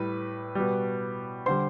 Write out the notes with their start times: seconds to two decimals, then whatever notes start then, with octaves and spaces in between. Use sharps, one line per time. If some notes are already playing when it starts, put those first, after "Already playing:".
Already playing: A2 G3 B4
0.55 B2 G3
1.46 D3 G3 C5 C6